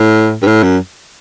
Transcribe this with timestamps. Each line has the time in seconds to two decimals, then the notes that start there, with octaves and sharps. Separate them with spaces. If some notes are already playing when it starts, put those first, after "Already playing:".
Already playing: A2
0.42 G2
0.47 A2
0.63 F#2